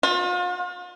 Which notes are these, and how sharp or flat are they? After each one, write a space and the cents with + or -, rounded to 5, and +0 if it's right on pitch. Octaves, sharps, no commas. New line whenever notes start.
F4 +40